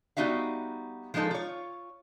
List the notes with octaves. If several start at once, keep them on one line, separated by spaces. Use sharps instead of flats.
G3 B3 D#4 F#4 E5 F5
F3 G#3 A#3 D#4 A4
F4 C#5